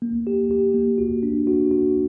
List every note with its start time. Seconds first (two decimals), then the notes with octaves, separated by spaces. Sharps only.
0.02 A#3
0.27 G4
0.51 G4
0.74 A#3
0.98 F#4
1.23 D4
1.47 F#4
1.71 F#4